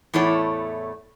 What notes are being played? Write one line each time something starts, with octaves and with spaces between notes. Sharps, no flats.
E2 A2 A3 E4 C#5